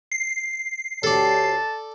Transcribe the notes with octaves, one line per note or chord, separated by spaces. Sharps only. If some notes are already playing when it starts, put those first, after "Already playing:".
C7
D2 G4 A4 C#5 D5 A5